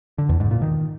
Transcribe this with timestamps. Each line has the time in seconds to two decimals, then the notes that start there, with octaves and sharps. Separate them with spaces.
0.18 D3
0.29 E2
0.40 G#2
0.51 A#2
0.62 D#3